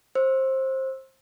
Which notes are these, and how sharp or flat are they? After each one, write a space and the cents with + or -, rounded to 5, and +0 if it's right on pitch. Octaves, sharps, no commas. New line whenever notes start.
C5 +20 E6 +0